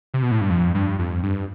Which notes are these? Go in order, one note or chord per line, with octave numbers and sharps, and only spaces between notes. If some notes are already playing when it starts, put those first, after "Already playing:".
C3
B2
A2
G2
F2
G2
F2
G2